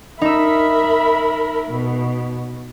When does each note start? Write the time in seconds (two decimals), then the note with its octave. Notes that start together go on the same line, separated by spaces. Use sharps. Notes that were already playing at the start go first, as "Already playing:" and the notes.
0.21 D#4 A#4 E5 B5 E6
1.68 B2